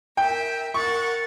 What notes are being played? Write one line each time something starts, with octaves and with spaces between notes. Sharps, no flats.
A#4 E5 G5
A#4 F#5 C#6 A6